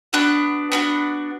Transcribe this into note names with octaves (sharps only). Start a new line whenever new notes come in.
B3 D4 F#4 F#6
B3 D4 F#4